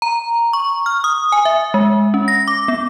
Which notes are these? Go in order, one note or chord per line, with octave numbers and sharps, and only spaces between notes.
A#5
C#6
F6
D#6
G#5
E5
G#3
C#4
A#6
D6
B3